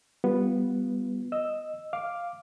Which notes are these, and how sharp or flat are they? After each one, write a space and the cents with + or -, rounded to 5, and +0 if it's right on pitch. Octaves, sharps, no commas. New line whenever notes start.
G3 +0 B3 +0 F4 +0
D#5 +0 E6 +0
F5 +0 D6 +0